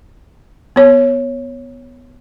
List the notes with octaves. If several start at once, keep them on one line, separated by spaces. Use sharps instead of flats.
B3 C#5